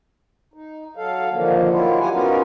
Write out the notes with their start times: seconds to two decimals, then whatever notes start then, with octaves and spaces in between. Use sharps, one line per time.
0.54 D#4
0.97 F#3 A4 F5
1.32 F2 D3 D#3 F3 A#3
1.71 D#3 F#3 A#3 E4 F4
2.00 G4 F#5 G#5
2.11 B3 C#4 D#4 F4 F#4 A#4